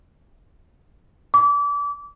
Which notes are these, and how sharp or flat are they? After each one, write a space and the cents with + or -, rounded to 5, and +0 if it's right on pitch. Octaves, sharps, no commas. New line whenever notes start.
D6 -30